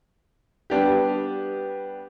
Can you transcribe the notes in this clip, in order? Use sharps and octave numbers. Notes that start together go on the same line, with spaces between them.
G3 B3 D4 G4